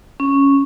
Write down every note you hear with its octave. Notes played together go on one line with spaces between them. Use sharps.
C#4